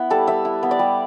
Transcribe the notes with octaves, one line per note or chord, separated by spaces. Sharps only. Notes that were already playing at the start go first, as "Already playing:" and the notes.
Already playing: B3 E4 B4
G3 A4
G3 E5
E4
B3
D5
G3